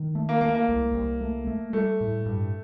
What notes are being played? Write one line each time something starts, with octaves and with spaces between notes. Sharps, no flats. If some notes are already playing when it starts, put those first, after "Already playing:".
Already playing: D#3
A3
A#3
A3 A#3
A#3
C2
C2
A3
A3
G3 A3
A2
G2